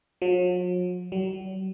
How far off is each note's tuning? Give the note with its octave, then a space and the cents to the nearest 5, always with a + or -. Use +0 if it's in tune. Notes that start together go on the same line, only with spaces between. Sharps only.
F#3 -45
F#3 +40